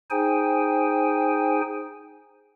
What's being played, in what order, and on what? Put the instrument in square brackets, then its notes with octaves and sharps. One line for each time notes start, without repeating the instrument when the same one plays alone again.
[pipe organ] D#4 G#4 C5 G5 G#5